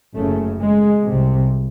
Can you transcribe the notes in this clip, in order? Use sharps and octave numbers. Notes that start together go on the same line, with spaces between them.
F#1 F#2 C#3 A3
G#3
C2 C3